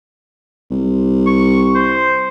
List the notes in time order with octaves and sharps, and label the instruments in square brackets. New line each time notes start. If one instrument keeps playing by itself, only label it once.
[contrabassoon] C2
[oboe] C#6
C5